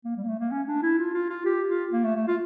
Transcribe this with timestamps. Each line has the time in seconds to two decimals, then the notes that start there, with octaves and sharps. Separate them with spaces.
0.05 A#3
0.17 G3
0.24 A#3
0.28 A3
0.40 A#3
0.51 C#4
0.67 D4
0.83 E4
0.98 F4
1.14 F4
1.30 F4
1.46 G4
1.68 F4
1.93 A#3
2.04 A3
2.16 A3
2.28 F4